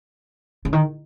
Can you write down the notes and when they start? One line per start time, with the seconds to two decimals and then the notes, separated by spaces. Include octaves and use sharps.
0.65 C#3
0.73 D#3